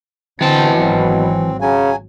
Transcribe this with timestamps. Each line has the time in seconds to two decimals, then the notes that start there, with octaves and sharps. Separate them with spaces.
0.41 B2 D3 E3 C4 A5
0.79 G#1 F#3 C4
1.61 C#3 F#3 G#5